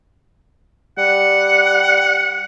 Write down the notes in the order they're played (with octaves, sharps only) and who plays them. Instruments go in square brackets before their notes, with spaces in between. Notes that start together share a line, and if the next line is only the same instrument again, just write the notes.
[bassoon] G3 [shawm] F#5